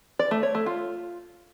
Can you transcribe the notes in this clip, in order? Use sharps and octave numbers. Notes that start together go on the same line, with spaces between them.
D5
A3
C#5
A3
F4